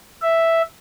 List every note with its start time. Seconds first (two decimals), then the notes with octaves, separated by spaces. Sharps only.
0.22 E5